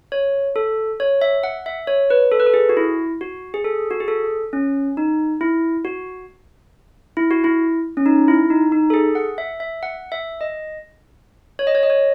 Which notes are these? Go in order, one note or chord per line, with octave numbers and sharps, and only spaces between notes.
C#5
A4
C#5
E5
F#5
E5
C#5
B4
A4
B4
A4
G#4
F#4
E4
F#4
G#4
A4
F#4
G#4
A4
C#4
D#4
E4
F#4
E4
F#4
E4
C#4
D#4
E4
D#4
D#4
A4
G#4
F#5
E5
E5
F#5
E5
D#5
C#5
D#5
C#5
D#5
C#5